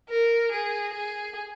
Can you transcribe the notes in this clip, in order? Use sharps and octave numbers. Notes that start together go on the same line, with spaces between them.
A#4
G#4
G#4